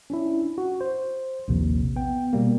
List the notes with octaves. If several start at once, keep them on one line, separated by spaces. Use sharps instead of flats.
C#4 D4 E4
F#4
C5
A#1 D#2 C3
B3 G5
B2 G3 A#3